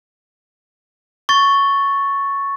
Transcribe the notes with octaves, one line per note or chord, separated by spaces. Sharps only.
C#6 A6